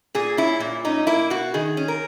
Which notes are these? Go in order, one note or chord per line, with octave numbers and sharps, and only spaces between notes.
A#2 G#4
C#4 E4
A#2
C#4 D#4
A#3 E4
B2 F#4
D#3 G#4
C#4
A#4